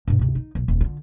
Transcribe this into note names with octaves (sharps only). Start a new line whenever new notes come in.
G2 B2
D2 C3
D#4
B1
D#1 D2
D3 F4